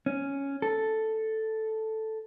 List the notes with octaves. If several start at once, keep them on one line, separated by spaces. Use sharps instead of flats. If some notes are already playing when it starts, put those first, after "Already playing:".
C#4
A4